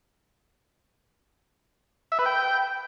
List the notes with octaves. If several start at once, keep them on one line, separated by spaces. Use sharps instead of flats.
E5
B4
G5